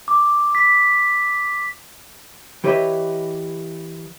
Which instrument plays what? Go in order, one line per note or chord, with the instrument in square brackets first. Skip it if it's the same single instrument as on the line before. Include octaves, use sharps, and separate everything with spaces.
[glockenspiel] D6
B6
[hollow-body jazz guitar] E3 G4 B4 C#5 D#5 E5